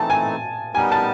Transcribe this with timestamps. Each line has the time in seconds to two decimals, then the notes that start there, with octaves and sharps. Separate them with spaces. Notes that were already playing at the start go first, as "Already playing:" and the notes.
Already playing: E3 A3 C4 D#4 A5
0.10 G#5
0.75 G3 B3 D#4 G4 A#4 G#5
0.92 A5